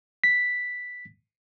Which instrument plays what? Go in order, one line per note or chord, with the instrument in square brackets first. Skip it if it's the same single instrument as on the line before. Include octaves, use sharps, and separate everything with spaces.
[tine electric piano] B6